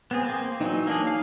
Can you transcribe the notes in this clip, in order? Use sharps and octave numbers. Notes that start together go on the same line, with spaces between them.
B3 C4 G#4
A#3 C4
E3 F#3 D#4
A#3 D4 G#4
F5